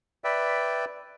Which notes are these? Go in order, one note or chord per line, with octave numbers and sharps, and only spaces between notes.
B4 D5 E5 G5